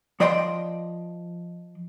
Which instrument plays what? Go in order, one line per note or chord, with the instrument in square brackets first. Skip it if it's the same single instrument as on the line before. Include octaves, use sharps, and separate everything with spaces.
[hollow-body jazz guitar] F3 D5 D#5 G5 C6